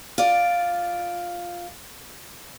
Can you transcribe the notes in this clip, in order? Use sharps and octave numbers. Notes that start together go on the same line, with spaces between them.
F4 D5